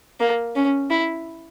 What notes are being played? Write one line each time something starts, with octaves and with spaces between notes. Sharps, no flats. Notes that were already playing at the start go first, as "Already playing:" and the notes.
A#3
C#4
E4